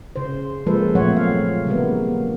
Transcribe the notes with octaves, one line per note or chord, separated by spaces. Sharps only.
C#3 C5
F3 G#3 A#3 A4 B4 C5
A#2 F#3 A3 C4 C#5 F#5
F5
C#3 G3 A#3 B3